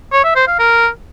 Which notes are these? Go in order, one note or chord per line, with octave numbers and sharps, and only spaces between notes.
C#5
E5
C5
F5
A#4